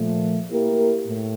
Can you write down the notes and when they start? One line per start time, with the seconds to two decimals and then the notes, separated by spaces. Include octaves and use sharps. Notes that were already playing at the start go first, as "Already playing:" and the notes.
Already playing: A#2 F3 A3
0.49 A#3 E4 G4 A#4
1.06 A2